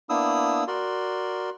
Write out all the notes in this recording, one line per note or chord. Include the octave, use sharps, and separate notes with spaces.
A#3 B3 D4 E4 D#6 E6
F#4 A#4 D5 C6